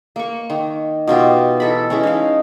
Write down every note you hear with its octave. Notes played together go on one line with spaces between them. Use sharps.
A#3 C#6
D#3
B2 D#4 F4 G4
E3 A4 B5
E3 G#3 C#4
D#4 F5